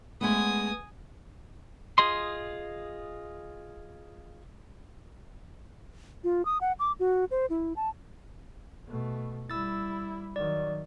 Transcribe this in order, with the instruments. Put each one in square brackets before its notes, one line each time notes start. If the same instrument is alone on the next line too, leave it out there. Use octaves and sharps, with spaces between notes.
[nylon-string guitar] G#3 A3 B3 [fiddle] G#5 D#6
[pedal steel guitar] F4 G#4 D#5 C6
[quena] F4
D#6
F#5
D6
F#4
C5
E4
A5
[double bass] B2 A3
[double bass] G3 E4 [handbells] E6 A6
[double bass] D#3 F#3 [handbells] D5